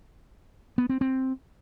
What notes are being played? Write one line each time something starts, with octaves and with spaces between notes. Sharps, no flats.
B3
C4
C4